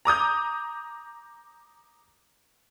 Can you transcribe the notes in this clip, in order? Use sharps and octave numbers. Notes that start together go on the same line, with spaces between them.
A#5 D6 D#6 G6